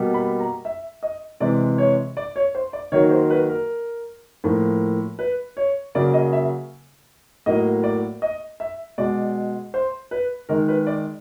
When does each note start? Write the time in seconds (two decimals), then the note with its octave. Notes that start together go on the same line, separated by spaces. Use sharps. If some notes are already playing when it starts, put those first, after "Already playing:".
Already playing: B2 G3 A#3
0.14 B5
0.40 A#5
0.65 E5
1.03 D#5
1.40 C3 E3 G#3 D5
1.78 C#5
2.17 D5
2.36 C#5
2.55 C5
2.73 D5
2.92 D#3 F#3 A#3 C#5
3.11 C5
3.30 B4
3.49 A#4
4.44 A2 F3 A#3
5.19 B4
5.57 C#5
5.95 C#3 F#3 A#3 D5
6.13 D#5
6.33 E5
7.46 A2 F#3 A#3 D#5
7.84 D5
8.22 D#5
8.60 E5
8.98 B2 G#3 D5
9.74 C5
10.11 B4
10.49 D#3 G#3 A#4
10.68 B4
10.87 D5